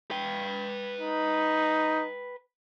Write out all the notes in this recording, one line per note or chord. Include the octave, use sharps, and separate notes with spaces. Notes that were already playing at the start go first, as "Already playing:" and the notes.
B4 G5
D#4